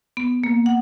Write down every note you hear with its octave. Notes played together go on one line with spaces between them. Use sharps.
B3
A#3
F#5